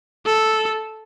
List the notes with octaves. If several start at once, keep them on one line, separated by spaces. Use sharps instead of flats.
A4